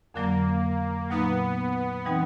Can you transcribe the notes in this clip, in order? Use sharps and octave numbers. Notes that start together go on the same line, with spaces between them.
F2 D3 F#3 A#3
A#2 F#3 A#3 B3 D#4
E3 G3 C4 D#4